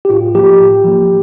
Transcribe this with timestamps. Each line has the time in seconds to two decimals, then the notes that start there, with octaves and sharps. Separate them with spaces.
0.05 G4
0.10 A2 F4
0.35 F3 A#3 G4
0.59 A2
0.84 F3 A#3